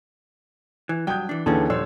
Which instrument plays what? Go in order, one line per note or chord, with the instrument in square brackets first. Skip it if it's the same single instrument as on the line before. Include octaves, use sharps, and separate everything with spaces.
[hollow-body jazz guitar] E3
[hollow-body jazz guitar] G2 F#3 [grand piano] G5 D#6 G6
[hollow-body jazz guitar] E3 D4
[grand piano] D#2 D3 E3 [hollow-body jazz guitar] C#4 G#4 A4
[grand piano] D#1 C#5 E6 [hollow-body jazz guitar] D3 F3 C5